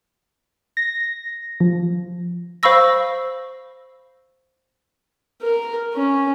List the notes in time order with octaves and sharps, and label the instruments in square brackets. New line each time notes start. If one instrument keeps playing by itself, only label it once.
[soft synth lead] A#6
F3
[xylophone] C5 F5 B5 C#6 E6 A#6
[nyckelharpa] A#4
C#4